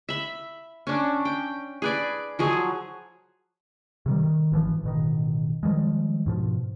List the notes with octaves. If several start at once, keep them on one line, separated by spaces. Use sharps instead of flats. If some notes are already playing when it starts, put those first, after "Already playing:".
E5 B5
C#4 D4
G5
G#4 B4 D5
F3 F#3 G#4
C3 D#3 G3
D#3
G#1 E3 F3
A1 B2 D#3
D#3 F3 G3 G#3
G#2 B2 F3